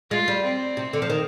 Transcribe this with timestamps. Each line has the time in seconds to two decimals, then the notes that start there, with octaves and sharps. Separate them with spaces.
0.11 G#3 F4
0.28 G3
0.44 C4
0.77 C3
0.93 D3
1.02 F3
1.10 D#3